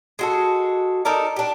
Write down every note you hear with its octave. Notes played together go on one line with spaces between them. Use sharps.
G#3 F#4 A4
D#4 A4 A#4 D5
D4 G4